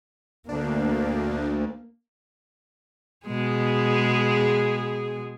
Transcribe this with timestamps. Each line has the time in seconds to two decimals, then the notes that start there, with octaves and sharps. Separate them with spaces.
0.49 D2 A#3 D4
3.27 B2 G#3 G#4